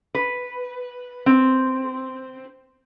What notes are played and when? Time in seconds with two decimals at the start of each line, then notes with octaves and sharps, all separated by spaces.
0.15 B4
1.26 C4